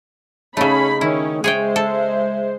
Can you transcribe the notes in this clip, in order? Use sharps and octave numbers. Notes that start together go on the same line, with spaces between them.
C#3 A3 C#4 D#4 C#5 B5
D#3 C#4 E4
G#3 G#4 C5 C#5 E5 G5
A4